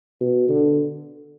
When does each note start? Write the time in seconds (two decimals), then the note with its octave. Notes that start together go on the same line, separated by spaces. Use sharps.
0.21 B2
0.49 D3